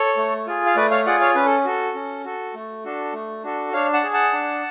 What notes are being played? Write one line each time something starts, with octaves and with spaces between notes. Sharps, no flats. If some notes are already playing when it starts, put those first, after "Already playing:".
Already playing: A4 C#5
A3
F4 G#4
F5
A3 B4 D5
C#5 F5
F4 G#4 D5 F#5
C#5 F5
C#4 B4
A4
F#4 A4
C#4
F#4 A4
A3
D4 F#4 A4
A3
D4 F#4 A4
D4 C#5 F5
F#5 A5
G#4
F#5 A5
D4